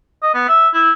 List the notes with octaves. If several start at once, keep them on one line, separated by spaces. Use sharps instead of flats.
D#5
B3
E5
E4